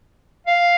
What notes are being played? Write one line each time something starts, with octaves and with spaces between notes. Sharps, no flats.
F5